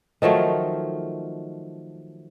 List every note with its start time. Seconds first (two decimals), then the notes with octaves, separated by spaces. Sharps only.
0.22 D#3 F3 F#3 A3